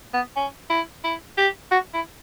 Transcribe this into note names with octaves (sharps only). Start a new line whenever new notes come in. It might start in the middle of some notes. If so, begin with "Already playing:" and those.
B3
C#4
E4
E4
G4
F#4
E4